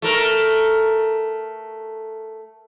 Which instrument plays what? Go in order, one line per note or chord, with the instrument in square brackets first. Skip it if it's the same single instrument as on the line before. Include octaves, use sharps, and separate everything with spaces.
[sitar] A3 A#4